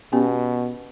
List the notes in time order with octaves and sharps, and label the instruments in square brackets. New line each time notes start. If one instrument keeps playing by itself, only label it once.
[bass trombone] B2 [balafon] B3 C#4 G4